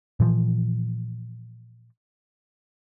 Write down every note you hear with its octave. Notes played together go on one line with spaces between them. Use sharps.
A#2 E3 F3